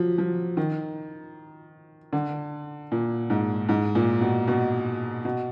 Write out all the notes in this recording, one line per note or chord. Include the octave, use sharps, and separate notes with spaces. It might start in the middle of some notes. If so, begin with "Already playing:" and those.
Already playing: F3 F#3
F3
D#3
D3
A#2
G#2
G#2
A#2
B2
B2
B2